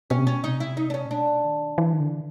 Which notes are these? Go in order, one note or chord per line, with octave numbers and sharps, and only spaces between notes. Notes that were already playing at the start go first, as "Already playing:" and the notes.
B2 C#4
C3
B2 C#4
C3 D#4
E4
D#4
D4
C#4
A#2
B2 D4
D#3
E3
D#3
D3